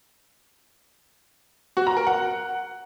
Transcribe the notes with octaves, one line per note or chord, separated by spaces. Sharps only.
F#4
A#5
A#4
F#5